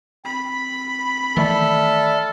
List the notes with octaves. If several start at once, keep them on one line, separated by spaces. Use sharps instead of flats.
C4 B5
D#3 E3 A3 A4 D5 E5 F6